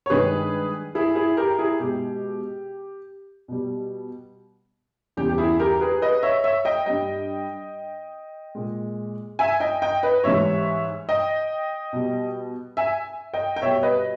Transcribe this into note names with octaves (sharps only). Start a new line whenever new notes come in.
C#5
G2 D#3 G#3 G#4 B4
E4 G#4
E4 G#4
G4 A#4
E4 G#4
B2 G#3 G4
B2 G3
E2 C#3 G3 G4
G4
E4 G#4
G4 A#4
G#4 B4
B4 D#5
C#5 E5
C#5 E5
D#5 G5
G2 G3 D#5 G5
A#2 G#3
E5 G#5
D#5 G5
D#5 G5
B4 D#5
G#2 E3 G3 C#5 E5
D#5 G5
B2 G3
E5 G#5
D#5 G5
G5
B2 G3 C#5 E5
B4 D#5